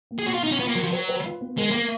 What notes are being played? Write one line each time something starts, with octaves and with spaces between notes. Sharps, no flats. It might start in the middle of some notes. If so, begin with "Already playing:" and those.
A#3
G#4
B2 F#4
F4
B2 D#4
C#4
B3 F4
A#3
F#3 A#4
F3
F#3 B4
B4
F4
B3
G#3 A#4
A#3 A#4